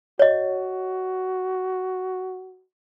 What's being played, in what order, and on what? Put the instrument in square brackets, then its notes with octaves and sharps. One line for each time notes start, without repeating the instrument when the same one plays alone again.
[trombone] F#4 [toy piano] C#5 D#5